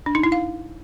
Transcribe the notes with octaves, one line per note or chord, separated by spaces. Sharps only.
D4
D#4
E4
F5